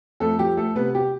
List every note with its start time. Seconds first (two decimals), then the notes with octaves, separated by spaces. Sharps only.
0.20 F2 A3 A4
0.39 F3 G4
0.57 A3 A4
0.75 C3 B3 B4
0.95 G4